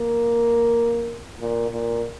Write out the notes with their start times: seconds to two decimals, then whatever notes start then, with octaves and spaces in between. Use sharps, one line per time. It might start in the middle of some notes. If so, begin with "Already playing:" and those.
Already playing: A#3
1.40 A#2
1.70 A#2